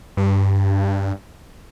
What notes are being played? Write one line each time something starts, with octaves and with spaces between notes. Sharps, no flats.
G2